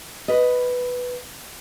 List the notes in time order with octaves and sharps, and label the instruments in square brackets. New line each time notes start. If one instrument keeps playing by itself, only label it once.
[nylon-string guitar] B4 D#5